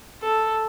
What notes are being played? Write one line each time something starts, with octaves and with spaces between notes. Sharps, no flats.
A4